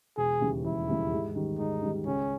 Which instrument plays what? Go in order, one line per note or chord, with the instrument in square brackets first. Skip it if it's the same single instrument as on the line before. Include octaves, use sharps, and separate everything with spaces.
[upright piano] E1 [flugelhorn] G#4
[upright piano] D#2 C#3 E3 G3
[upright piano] E1 [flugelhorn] E4
[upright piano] D#2 C#3 E3 G3
G#2
D#3 G3
[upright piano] G#2 [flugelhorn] D#4
[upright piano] D#3 G3
[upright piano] C#2 [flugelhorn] C#4